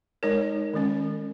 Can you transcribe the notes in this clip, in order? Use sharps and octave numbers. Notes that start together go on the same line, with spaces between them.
G#3 D#4 A#4 C#5
D#3 G#3 C#4